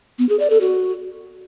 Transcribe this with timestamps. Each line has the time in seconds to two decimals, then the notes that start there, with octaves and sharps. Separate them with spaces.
0.19 B3
0.29 G#4
0.40 D5
0.50 A4
0.61 F#4